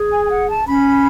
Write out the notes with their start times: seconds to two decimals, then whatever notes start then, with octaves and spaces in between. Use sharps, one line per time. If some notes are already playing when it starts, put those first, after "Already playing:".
Already playing: G#4
0.11 G#5
0.24 G#5
0.30 F#5
0.49 A5
0.67 C#4 B5